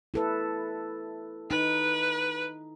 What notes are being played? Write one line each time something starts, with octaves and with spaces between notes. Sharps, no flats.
E4 A4 B4
D#4 B4